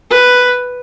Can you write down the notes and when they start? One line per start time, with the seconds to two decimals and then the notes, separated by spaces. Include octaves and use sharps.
0.10 B4